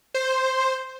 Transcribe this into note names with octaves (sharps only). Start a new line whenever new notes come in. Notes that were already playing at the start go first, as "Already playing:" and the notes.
C5